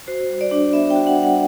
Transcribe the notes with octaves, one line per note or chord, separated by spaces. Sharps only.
F#4 C5
G3
D5
D4
B3 E5
G5
F#4
F#5
G3
F#5